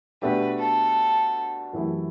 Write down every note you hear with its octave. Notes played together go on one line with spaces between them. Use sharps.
B2 A3 D4 G4 B4
A4
F#2 E3 A3 E4 G4